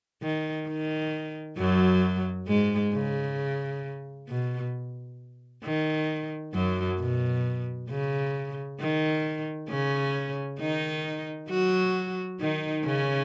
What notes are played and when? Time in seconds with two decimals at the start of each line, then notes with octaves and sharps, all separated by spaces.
0.23 D#3
0.68 D#3
1.58 F#2 F#3
2.48 G#2 G#3
2.93 C#3
4.29 B2
5.64 D#3
6.54 F#2 F#3
6.99 B2
7.90 C#3
8.80 D#3
9.70 C#3 C#4
10.60 D#3 D#4
11.50 F#3 F#4
12.40 D#3 D#4
12.85 C#3 C#4